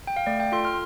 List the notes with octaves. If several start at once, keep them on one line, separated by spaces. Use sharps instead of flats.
G5
F5
A3 D5
G5
F4 A4 C6
F6